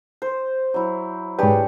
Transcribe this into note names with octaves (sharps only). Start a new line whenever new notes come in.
C5
F#3 E4
G#2 D4 G4 G#4 B4 C#5